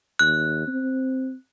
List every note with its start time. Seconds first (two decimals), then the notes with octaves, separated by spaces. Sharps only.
0.19 D#2 F#6
0.68 C4